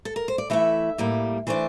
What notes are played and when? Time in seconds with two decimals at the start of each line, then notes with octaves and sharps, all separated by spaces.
0.05 A4
0.16 A#4
0.28 C5
0.38 D5
0.50 E3 A3 E4 E5
0.98 A2 G3 A#3
1.47 E3 A3 D4 C5